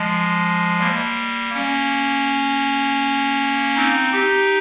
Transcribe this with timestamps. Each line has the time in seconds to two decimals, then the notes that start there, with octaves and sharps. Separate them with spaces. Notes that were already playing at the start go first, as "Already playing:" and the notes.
Already playing: F3 G#3
0.80 G3 A#3
1.54 A#3 C#4
3.76 C4 D#4
4.13 D#4 G4